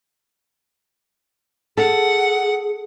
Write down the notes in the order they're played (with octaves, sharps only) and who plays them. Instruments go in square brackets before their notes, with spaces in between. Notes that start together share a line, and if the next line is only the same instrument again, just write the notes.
[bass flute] G#4 [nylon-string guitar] A4 [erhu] F#5